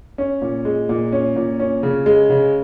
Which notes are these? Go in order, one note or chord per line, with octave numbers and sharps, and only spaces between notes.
C#4
A#2
G#3
A#2
C#4
A#2
C#4
C#3
G#3
C#3